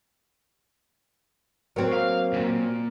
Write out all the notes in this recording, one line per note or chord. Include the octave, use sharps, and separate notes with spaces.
F#3 C4 A#4
A#3 F5
C#2 A#2